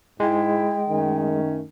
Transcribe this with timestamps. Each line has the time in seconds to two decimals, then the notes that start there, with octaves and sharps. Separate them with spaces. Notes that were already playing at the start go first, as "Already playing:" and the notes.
0.20 G#2 G#3 E4 G5
0.89 F#2 D#3 A3 C#4